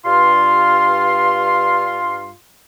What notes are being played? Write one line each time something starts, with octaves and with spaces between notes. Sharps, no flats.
G2 F4 C6